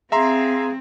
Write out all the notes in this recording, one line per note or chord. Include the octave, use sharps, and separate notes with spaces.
C4 G#4 E5 F5 A#5 C6